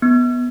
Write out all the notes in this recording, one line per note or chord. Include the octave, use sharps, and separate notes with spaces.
B3